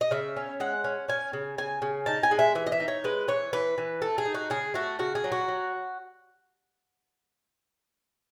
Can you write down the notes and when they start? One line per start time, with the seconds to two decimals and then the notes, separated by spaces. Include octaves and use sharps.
0.01 D#5
0.11 C#3 E5
0.36 C#4
0.60 G#3 F#5
0.84 C#4
1.08 C#4 G#5
1.33 C#3
1.58 C#3 G#5
1.82 C#3
2.06 D#4 A5
2.23 G#5
2.31 G#3
2.39 E5
2.55 E3 E5
2.66 D#5
2.72 E5
2.80 D#4
2.88 C#5
3.04 G#3 B4
3.28 E3 C#5
3.53 E3 B4
3.78 E3
4.02 A3 A4
4.18 G#4
4.25 D#4
4.35 F#4
4.50 C#3 G#4
4.74 A3 F#4
4.99 C#3 F#4
5.15 G#4
5.24 F#3
5.32 F#4
5.48 F#3